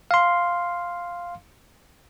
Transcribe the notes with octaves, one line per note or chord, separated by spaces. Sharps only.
F5 C6